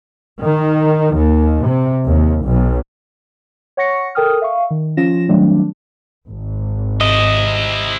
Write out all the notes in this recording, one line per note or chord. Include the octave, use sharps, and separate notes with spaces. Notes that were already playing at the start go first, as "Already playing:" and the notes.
D#3
D#2
C3
D#2
B1
C#5 F#5 C#6 A#6 C#7
A4 A#4 G5 D#6 F6
E5 F5 C#6
D#3
F3 C#4 F4 A#6 E7
D#3 F#3 G3 A3 C4 D4
G#1
C3 E4 D#5